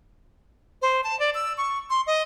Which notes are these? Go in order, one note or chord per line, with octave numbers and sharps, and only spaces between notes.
C5
A5
D5
E6
C#6
C6
D#5